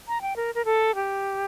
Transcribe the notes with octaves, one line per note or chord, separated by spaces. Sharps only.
A#5
G5
A#4
A#4
A4
G4